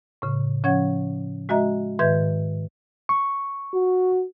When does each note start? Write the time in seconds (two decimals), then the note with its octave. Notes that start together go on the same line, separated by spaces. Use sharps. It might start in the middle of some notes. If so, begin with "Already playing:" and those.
0.22 A2 C#3
0.64 F3 C#4 C#5 F#5 G#6
1.49 G#3 F#4 D#5 E5 A#5
1.99 G#2 D#3 B4 E5 G6 G#6
3.09 C#6
3.74 F#4